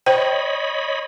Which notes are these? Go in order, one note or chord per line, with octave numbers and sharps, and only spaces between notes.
C5 C#5 D#5 G5 B5